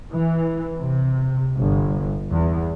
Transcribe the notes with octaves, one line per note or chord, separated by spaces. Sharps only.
E3
C3
G1
E2